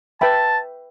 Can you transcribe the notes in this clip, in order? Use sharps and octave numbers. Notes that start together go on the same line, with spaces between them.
B4 E5 G5 A5 B5